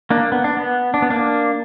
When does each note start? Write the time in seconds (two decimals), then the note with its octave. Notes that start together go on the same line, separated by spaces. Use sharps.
0.10 A#3 D4
0.32 B3
0.44 D4
0.57 B3
0.94 D4
1.02 B3
1.10 A#3 D4